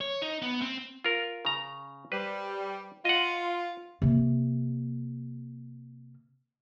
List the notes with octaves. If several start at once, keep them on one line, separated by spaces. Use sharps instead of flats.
C#5
D#4
B3
C4
F4 A#4
C#3 A#5
G3 B4 C5
F4 D#5 F#5
C3 A#3